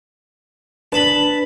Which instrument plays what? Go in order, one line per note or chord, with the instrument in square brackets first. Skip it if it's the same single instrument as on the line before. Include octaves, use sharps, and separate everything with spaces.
[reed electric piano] D4 B4 [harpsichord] A5 B5